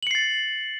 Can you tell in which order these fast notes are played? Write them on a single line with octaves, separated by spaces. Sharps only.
F#7 C#7 C7 A6